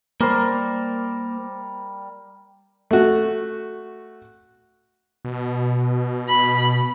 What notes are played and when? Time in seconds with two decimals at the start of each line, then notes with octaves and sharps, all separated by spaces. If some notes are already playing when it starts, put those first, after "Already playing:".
0.21 G3 A#3 A#4 C5 D5
2.91 A3 F#4
5.25 B2
6.28 B5